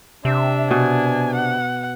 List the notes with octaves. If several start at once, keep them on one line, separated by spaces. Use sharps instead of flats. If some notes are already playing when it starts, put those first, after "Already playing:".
C3 D4 E5
B2 G#5
F#5